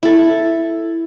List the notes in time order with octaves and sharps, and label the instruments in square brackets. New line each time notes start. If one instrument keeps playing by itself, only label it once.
[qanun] E4 A4